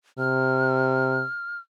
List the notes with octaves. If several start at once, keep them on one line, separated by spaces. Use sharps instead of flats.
C3 F6